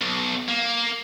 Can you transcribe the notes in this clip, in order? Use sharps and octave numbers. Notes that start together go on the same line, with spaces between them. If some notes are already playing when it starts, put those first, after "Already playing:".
B1
A#3